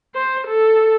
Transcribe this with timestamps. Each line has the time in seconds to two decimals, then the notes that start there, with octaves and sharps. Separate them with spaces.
0.15 C5
0.47 A4